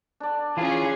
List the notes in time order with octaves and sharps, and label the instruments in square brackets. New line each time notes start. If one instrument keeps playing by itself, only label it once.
[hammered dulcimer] D4 D5
[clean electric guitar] E3 F4 [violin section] C#4 G#4